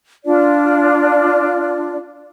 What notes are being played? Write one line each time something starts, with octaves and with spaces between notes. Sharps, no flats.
D4 F4 D5